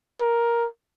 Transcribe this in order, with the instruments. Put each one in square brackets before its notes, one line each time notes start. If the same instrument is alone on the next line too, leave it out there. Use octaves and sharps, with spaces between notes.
[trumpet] A#4